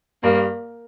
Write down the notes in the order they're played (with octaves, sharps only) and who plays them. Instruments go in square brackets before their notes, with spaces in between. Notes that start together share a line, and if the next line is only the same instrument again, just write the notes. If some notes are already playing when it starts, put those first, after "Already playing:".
[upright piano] G2 [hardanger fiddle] A#3